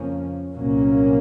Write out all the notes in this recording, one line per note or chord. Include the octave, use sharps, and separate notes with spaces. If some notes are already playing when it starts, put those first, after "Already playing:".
Already playing: F2 C#3 F3 A#3 C#4
C2 A#2 F#3 A#3 C#4